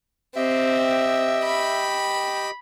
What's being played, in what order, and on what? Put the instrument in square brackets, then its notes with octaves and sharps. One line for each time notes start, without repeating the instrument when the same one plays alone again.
[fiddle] C4 [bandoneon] G4 D#5 G5 [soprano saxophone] E5
[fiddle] B5